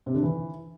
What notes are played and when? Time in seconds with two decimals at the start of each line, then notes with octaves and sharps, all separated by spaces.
0.06 C3
0.14 D3
0.23 E3